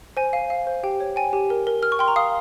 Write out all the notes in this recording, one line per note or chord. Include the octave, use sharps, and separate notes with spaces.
C5 G#5
F5
F5
C5
G4 G5
C#5
G5 G#5
G4
A#4
A#4
A#4 F6
C#6
G5 C6
A#5
F5 D#6